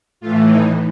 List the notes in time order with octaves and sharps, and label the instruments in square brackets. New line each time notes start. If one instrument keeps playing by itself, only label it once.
[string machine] A2 E3 F4
D#4